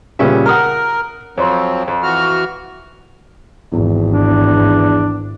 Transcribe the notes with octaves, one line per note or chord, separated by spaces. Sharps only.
A#2 C#3 G3 B3 C#4 E5
A#4 F#5 A#5 D#6 F6
F2 F3 F#3 C4 C5 C#5 C6
F2
E3 F#4 F6
G#1 E2
D4